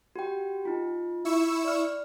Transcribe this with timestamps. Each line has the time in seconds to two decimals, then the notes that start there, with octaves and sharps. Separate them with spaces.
0.16 F#4 G4 G5
0.65 D#4 F4
1.25 E4 C#6 E6
1.64 D5 F6